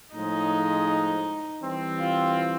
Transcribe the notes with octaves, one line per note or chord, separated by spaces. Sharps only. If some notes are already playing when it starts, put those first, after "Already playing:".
A2 F3 G#3 D#4
E3 G3 C4
F4